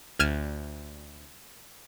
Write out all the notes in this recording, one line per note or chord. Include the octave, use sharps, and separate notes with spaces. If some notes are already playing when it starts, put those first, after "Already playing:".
D2 F6 G#6 D#7 E7